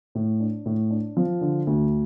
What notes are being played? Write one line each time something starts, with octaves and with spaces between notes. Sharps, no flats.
A2
D4
A2
D4
F3
D3
D2